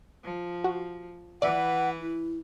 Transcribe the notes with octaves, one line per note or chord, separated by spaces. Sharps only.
F3
F#4
E3 B4 D5 E5 F#5
E4